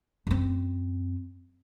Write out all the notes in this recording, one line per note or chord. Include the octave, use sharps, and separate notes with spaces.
F#2 C4